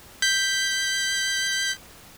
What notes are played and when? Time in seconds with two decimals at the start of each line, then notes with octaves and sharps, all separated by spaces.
0.22 G6 B6